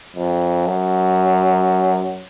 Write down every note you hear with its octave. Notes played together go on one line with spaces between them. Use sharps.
F2
F#2